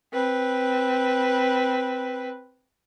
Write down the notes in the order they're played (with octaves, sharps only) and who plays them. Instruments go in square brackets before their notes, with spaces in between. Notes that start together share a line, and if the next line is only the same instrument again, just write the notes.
[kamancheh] C4 B4